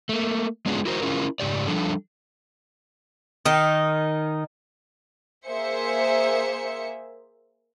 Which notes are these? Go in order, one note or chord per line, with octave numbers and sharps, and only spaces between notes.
A3 A#3
G#3 B3 C#4 D4 F4 G#4
E4 F#4 A#4 C5
C#4 E4 F4 G#4 A#4
G#2 C#3 G4 D5
F3 G3 D4 A4
D#3 D#4
A#3 G#4 C5 E5 C#7